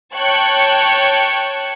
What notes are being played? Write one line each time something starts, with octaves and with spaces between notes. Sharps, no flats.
C#5 G5 A5 C#6 F#6 C#7